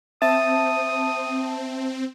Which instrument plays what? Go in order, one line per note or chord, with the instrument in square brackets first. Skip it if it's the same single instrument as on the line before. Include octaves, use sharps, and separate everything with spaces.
[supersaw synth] C4 [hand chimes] E5 [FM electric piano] A5 [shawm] D#6